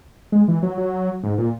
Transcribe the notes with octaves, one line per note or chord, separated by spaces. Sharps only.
G#3
E3
F#3
F#3
G#2
A#2